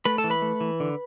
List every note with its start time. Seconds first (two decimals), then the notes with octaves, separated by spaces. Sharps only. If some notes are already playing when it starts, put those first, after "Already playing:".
0.05 A3 B4 B5
0.18 A4 A5
0.24 E3
0.30 B4 B5
0.42 A3
0.61 E3
0.80 D3